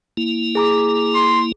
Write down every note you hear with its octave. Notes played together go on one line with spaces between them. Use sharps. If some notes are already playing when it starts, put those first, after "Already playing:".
A#3 E4
G#4 A#5 D6
C6